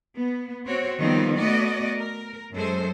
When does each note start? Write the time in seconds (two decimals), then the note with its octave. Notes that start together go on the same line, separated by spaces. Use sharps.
0.17 B3
0.66 C4 F#4 C5 C#5
0.99 D#3 F3 G3 B3 C4 D#4
1.38 A3 B3 F#4 D5 D#5
1.97 A#4
2.54 F#2 G#3 A4 C5